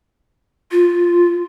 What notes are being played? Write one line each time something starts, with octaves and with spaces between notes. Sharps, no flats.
F4